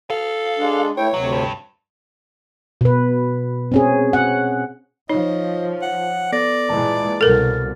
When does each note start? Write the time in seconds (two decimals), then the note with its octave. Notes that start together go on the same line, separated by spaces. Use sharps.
0.10 A4 F5
0.58 G#3 D4
0.97 A3 E4 C#5 G5
1.14 D2 C3 F#3
1.32 G2
2.81 B2 B4
3.72 C4 C#4 G#4
4.13 F#5
5.09 F3 D#4 C#5 D#5
5.82 F#5
6.32 B3 A4 D5 A#6
6.69 A#2 E3 G#3 A5 A#5
7.21 C2 B2 A4 A#4 F6 A6